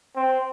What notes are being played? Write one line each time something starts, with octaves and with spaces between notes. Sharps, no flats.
C4